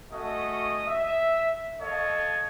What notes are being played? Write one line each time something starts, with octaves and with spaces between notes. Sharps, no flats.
A3 C#4 F#4 D#5 D#6
E5
A4 C#5 D#5 F5 A5